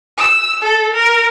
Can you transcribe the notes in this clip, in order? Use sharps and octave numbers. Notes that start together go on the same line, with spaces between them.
E6
A4
A#4